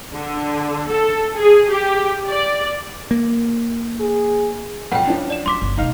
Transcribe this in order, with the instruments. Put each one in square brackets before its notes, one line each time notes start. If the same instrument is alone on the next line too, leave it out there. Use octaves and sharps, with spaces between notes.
[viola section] D3
A4
G#4
G4
D5
[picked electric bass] A#3
[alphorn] G#4
[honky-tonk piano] B1 F2 [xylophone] F#5 G5
[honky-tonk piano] F3 C#4 D4
[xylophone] D5 E7
[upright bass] F#3 [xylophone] C6 D6 B6
[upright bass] G1
[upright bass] C#2 B2 [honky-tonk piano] D#4 F5 F7